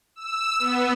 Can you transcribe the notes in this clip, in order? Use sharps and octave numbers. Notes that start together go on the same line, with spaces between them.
E6
B3